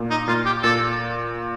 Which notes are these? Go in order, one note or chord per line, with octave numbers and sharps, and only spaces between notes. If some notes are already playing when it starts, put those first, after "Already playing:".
Already playing: A#2
D#4
A#2 F4
G4
A#2 A4